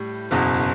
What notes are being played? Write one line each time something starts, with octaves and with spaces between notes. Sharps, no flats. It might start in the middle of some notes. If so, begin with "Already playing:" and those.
Already playing: A2 G3
F#1 E2 B2